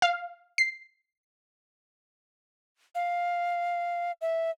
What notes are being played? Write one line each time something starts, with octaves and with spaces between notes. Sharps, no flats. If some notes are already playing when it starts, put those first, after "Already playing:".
F5
C7
F5
E5